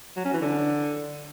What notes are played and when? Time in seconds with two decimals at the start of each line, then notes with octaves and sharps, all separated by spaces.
0.17 F#3
0.25 C#4
0.33 E3
0.42 D3